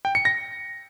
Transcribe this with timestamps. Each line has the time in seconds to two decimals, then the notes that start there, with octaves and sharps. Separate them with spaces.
0.05 G5
0.15 C#7
0.25 A#6